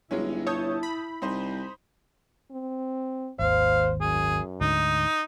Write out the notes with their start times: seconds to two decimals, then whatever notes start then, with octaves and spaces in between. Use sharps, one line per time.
0.11 G1 F#3 G#3 C#4 E4
0.47 C#5 A5 D#6 G6
0.83 B5
1.22 C2 D#4 C5
2.51 C4
3.39 G#1 D#2 C5 F5
4.01 F#2 G#4
4.61 D2 G#2 D3 D#4